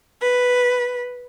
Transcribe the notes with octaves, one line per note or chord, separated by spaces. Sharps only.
B4